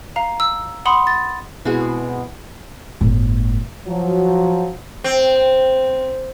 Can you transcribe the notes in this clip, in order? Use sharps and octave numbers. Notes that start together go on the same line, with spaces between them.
F5 A#5
E6
F#5 B5 C6 D#6
A6
B2 G#3 B3 C4 E4 F#4 G#4
G1 A2
F3 F#3
C4